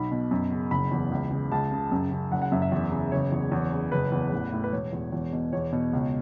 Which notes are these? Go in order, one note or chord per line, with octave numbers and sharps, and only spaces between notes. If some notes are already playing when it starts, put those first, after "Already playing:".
Already playing: B1 B5
B2
F#2
C#3
F#1 B5
E2
C#2
C#3
C#2 A5
C#3
F#2
C#3
F#1 F#5
F#5
F#2 E5
E5
E2
C#3
F#1 C#5
E2
E2
C#3
F#1 B4
E2
A1
A2
B4
E1 C#5
E2
E2
B2
E2 C#5
B2
C#2